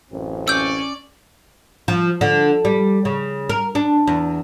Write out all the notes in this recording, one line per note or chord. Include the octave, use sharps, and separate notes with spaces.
A1 F#2 C4
C#4 D5 E6 G6
F3
D3
G3
C#3
A#4
D4
E2